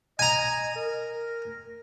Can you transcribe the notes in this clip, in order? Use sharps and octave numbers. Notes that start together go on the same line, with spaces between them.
D#5 G#5 A#5
A#4